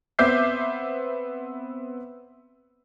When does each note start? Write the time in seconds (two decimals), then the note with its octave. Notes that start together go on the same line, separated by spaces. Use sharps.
0.19 B3 C4 E5 D6 G6 C7